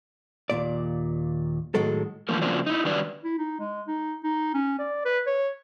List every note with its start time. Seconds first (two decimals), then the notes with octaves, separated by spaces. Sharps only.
0.50 D#2 A#2 D5
1.75 A2 D#3 F#3 G#3 A4
2.29 D3 E3 F3 A3 A#3 A#4
2.42 C#3 F3 F#3 A#3 C4 D4
2.66 D#4 E4
2.85 D#3 F#3 G3 D4 B4 D5
3.24 E4
3.38 D#4
3.60 G#3
3.87 D#4
4.24 D#4
4.54 C#4
4.79 D5
5.05 B4
5.27 C#5